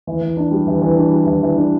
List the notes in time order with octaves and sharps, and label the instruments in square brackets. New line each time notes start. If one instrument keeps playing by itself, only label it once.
[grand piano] E3
E3
D4
G3
E3
E3
D4
G3
E3
E3
D4